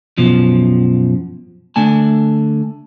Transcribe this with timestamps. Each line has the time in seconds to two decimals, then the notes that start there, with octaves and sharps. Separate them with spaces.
0.18 F#2 B2 F3
1.76 D3 A3 G#5 A5